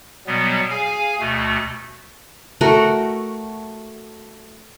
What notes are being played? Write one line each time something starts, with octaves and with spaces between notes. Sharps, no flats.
B2 F#3 G3 B3
G#4 F5 G#5
D2 B2 A3
A3 F#4 A#4